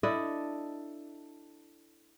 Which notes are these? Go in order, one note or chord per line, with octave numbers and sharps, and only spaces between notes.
D4 E4 A4 D#5